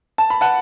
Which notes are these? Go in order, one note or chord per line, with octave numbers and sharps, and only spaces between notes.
A5
B5
F#5 A5